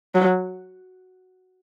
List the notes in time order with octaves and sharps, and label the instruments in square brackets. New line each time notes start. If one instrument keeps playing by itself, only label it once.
[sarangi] F#3